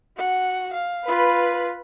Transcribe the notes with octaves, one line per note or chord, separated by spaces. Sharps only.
F#4 F#5
F5
F4 B4